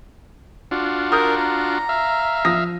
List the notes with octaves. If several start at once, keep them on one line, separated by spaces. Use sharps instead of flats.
D4 F4 F#4
A#4 D#6 F6 G6
A#5
E5 F5
F3 D#6 A#6